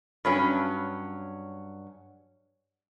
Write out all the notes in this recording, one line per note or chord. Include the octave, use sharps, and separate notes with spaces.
G2 F#3 C#4